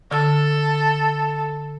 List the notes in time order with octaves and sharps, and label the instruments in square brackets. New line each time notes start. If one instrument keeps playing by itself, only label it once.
[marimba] D3 E6 [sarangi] A4